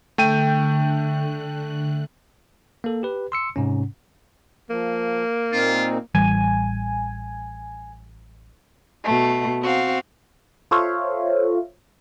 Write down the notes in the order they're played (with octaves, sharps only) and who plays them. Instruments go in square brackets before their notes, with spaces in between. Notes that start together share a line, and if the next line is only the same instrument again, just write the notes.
[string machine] D3 F#6 [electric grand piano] A3 G5 D#7
[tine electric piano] A#3 A4
G4 B4
C6 E6 C#7
G#2 C3 C#4
[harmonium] F3 [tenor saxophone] A#3
[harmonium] A#2 C4 D#4 [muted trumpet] F4
[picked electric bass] A1 E3 G3 [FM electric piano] G#5
[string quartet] B2 A3
C4 F#4 F5
[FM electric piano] F4 A4 C5 C#5 E5 F5